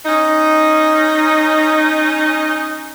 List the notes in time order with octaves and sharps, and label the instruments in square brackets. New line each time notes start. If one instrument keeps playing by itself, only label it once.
[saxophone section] C#4 D#4